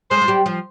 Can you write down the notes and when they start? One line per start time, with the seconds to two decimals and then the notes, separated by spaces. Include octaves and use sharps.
0.11 G#3 G#4 C5
0.22 F4
0.28 G3 G4
0.46 F3 F4